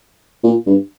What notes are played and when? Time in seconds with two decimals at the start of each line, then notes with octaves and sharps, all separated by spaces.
0.44 A#2
0.66 G2